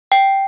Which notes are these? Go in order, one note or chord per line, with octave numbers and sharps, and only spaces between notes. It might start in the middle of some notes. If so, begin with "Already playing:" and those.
G5